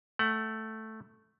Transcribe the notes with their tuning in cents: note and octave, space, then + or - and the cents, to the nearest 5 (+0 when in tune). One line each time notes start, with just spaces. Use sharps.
A3 +0 F#5 +25